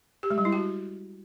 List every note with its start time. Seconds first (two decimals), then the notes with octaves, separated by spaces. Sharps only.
0.23 G4
0.30 G#3
0.38 G3
0.45 E4
0.52 F#4